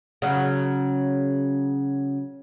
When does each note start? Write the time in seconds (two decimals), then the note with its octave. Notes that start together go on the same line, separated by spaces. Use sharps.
0.22 C#3 F#3